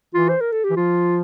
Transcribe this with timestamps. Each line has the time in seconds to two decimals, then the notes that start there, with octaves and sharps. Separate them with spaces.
0.14 E3 F4
0.29 C5
0.41 A#4
0.52 A4
0.64 G4
0.70 E3
0.76 F3 F4